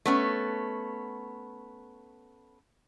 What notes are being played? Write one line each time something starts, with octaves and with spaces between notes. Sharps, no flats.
A3 B3 C#4